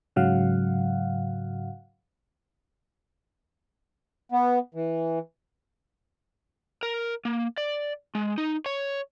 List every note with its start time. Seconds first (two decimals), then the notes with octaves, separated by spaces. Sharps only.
0.16 G#2 C#3 F#3 F5 F#5
4.32 B3
4.75 E3
6.83 A#4
7.25 A#3
7.58 D5
8.15 G#3
8.38 D#4
8.66 C#5